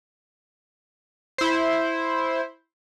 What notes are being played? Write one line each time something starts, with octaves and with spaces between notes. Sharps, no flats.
E4 C5